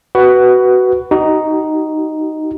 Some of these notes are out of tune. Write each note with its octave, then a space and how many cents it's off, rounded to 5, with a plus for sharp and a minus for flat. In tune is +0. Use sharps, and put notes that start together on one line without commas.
F#4 +15 B4 +0
D#4 +0 F#4 +40